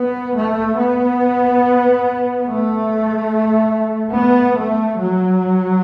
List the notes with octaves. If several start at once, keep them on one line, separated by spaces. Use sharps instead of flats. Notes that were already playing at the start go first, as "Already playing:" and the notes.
Already playing: B3
A3
B3
A3
B3
A3
F#3